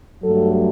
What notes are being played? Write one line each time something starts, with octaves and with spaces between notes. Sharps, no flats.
G2 F#3 A3 A4